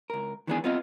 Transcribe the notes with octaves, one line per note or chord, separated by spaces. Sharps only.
C#2 A#4
D#3 E3 A3 B3 D4 G#4
B3 C4 F4 D#5 F5